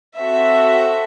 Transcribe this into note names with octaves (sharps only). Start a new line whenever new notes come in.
C4 F#4 A4 E5